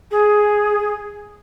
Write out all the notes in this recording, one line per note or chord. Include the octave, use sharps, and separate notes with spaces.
G#4